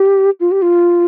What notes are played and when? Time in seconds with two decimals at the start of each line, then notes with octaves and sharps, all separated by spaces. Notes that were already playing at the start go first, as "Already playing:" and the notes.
Already playing: G4
0.40 F4
0.51 G4
0.62 F4